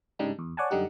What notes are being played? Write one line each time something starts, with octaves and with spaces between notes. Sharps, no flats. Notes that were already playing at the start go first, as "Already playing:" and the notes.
G#2 C#3 G3 D4 D#4
E2
C#5 D5 F#5 G#5 A5
F#2 D3 G3 D#4 G4 F#5